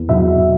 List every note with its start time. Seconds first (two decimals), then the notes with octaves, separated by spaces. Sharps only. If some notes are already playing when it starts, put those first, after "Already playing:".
Already playing: E2
0.09 B2 F#3 E5